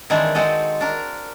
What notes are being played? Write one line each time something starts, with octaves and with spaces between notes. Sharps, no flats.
D#3 E3 G#3 C4 D4 D#4
G#3 C4 F#4 A4 D#5
D4 A#4